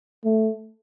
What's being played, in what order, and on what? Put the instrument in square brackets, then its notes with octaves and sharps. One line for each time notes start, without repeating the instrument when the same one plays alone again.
[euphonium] A3